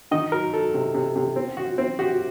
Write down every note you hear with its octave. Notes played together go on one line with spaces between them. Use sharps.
D#3 D#5
F#3 A#4
F#3 A4
C3
C3
C3
C4
F#4
C4
F#4 G4